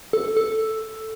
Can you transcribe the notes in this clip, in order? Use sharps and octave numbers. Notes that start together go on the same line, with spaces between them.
A4
A4